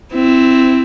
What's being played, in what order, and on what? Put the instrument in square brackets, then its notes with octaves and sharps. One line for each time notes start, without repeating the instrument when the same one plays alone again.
[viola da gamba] C4 E4